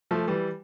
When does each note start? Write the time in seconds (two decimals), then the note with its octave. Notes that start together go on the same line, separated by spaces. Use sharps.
0.11 F3 A3
0.28 E3 G3